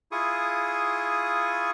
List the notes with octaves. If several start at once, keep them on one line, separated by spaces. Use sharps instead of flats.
E4 F4 G#4 C#6 D#6